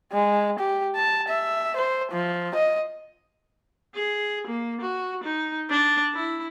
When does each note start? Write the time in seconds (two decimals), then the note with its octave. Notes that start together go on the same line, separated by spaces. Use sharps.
0.13 G#3
0.59 G4
0.95 A5
1.28 E5
1.76 C5
2.12 F3
2.54 D#5
3.95 G#4
4.47 A#3
4.81 F#4
5.24 D#4
5.70 D4
6.15 E4